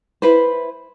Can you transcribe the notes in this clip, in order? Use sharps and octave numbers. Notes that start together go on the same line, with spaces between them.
E4 B4 C5